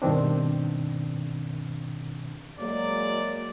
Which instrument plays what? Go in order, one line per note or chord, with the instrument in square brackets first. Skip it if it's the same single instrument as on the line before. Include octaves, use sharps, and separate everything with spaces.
[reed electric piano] G2 B2 D#3 C4 D4
[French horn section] F#3 G#3 A#3 [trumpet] D5